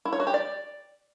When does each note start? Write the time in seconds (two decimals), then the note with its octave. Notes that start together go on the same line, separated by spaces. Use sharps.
0.05 E4
0.13 C#5
0.20 F#4
0.27 G4
0.34 D5